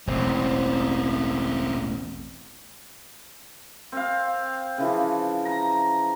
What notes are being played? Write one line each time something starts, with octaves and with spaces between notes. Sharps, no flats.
E1 A1 A2 C4
C4 F5
C#3 E3 F3
A#5